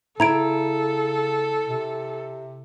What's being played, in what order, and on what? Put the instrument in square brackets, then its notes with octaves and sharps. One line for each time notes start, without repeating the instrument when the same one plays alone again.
[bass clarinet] C#3 [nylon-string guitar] E4 [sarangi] A4 [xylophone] A#5 G#6 D7
[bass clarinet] C3